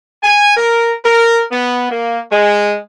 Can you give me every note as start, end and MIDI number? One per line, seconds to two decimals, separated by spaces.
0.22 0.55 80
0.56 0.92 70
1.03 1.41 70
1.51 1.86 59
1.90 2.19 58
2.29 2.74 56